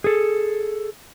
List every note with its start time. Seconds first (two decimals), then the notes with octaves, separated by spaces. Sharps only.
0.04 G#4 A4